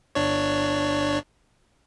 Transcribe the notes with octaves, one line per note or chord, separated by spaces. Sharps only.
G1 D4 C#5